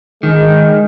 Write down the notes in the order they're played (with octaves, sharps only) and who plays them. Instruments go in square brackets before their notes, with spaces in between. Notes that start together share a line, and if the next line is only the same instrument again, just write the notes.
[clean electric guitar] D#3 [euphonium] G#3